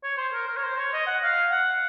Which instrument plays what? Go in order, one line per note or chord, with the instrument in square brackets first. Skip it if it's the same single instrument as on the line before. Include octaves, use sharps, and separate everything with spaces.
[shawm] C#5
C5
A#4
A#4
C#5
C5
C#5
D#5
F#5
F5
F#5